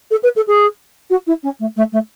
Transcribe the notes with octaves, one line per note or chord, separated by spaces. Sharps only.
A4
B4
A4
G#4
F#4
E4
C#4
A3
A3
A3